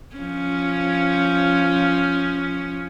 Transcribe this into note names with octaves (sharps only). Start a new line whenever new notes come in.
F3 C#4